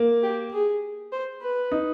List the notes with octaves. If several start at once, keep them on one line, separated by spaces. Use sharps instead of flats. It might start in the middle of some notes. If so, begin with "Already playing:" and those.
Already playing: A#3
G4
G#4
C5
B4
D#4